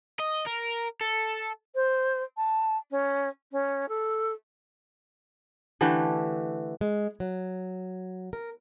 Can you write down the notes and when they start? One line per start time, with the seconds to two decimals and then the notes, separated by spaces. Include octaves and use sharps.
0.20 D#5
0.46 A#4
1.01 A4
1.74 C5
2.37 A5
2.91 C#4
3.52 C#4
3.89 A4
5.81 D3 E3 A3 G4
6.81 G#3
7.20 F#3
8.33 A#4